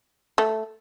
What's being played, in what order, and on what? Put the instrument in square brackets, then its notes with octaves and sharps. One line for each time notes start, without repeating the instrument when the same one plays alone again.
[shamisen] A3